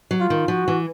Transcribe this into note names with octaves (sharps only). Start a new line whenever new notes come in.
F#3
F4
D#3
F3 F#4
E3